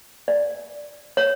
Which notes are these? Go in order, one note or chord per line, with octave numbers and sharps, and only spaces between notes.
D5
C#5